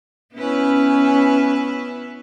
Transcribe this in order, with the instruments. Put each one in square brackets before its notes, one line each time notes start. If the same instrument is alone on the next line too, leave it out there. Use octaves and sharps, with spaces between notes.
[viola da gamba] B3 E4 B4 [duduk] C#4